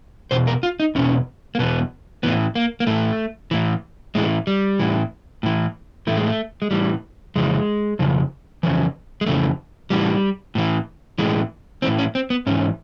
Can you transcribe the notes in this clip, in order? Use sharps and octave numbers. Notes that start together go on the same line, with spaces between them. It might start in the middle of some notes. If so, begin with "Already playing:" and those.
E2 B2 C5
A#4
F4
D#4
E2 B2 C#4
A#3
E2 B2 B3
A2 E3 B3
A#3
A#3
A2 E3 A3
A2 E3
A2 E3 G#3
G3
A2 E3
A2 E3
A2 E3 A3
G#3
A3
G#3
A2 E3 G3
F2 C#3 E3 G#3
F2 C#3 E3
F2 C#3 E3
G#3
F2 C#3 E3 A3
A2 E3 G3
A2 E3
A2 E3 G#3
A2 E3 C4
C#4
C4
B3
G#2 E3 C#4